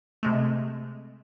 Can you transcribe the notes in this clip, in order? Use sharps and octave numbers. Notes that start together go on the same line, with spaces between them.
C3 G#3 A3